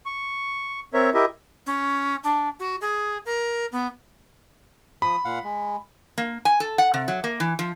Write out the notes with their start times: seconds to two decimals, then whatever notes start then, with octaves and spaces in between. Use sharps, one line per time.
0.06 C#6
0.94 C4 A#4 C#5 E5
1.14 E4 G4 A#4 D#5 E5
1.66 C#4
2.24 D4
2.59 F#4
2.81 G#4
3.26 A#4
3.72 B3
5.02 F3 B5 D#6
5.25 A#2 F5 F#5
5.44 G#3
6.18 A#3
6.45 G#5
6.60 A4
6.78 F#5
6.94 C3
7.08 F#3
7.24 A#3
7.40 E3
7.59 F3